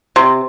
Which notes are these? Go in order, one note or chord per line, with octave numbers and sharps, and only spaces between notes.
C3